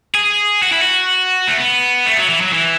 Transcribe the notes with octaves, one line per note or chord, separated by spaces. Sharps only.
G#4
F#4
E4
F#4
A3
B3
A3
F#3
E3
F#3
E3